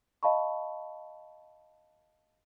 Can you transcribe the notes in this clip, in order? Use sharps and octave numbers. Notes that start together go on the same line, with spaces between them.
D#5 F5 A5 B5 C#6